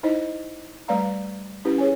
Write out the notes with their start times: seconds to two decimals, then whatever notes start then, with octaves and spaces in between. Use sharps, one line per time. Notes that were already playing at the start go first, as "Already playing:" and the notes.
0.03 D#4 E4 C5 D#5
0.88 G3 A3 B4 D5 F5 A#5
1.65 C#4 E4 G4 B4
1.78 G#4 C#5 G#5